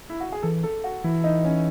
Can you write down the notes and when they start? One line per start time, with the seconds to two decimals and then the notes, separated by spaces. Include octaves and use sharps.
0.10 E4
0.20 F#4
0.32 G#4
0.43 E3 A4
0.63 A4
0.84 F#4
1.04 E3 E4
1.24 D#4
1.44 C#4